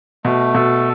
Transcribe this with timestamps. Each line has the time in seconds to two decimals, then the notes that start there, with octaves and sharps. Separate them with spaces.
0.25 B2 A3
0.54 B2 A4